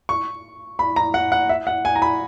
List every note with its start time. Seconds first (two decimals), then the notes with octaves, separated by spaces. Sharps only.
0.09 C#6
0.79 B5
0.96 A#5
1.14 F#5
1.32 F#5
1.49 E5
1.67 F#5
1.85 G#5
1.96 A#5
2.02 B5